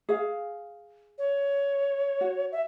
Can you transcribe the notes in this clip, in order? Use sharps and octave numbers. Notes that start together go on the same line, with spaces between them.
G#4 F5
C#5
F#4
E5